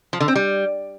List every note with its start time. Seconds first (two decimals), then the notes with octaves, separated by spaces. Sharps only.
0.13 F3
0.20 D3
0.28 C4
0.36 G3